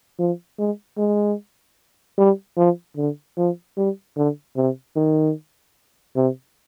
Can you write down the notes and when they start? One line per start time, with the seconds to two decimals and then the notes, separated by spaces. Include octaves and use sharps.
0.19 F3
0.59 G#3
0.98 G#3
2.18 G3
2.57 F3
2.97 D3
3.37 F3
3.77 G3
4.17 D3
4.57 C3
4.96 D#3
6.16 C3